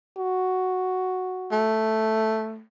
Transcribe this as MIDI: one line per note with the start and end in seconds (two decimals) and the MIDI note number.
0.18 1.71 66
1.52 2.62 57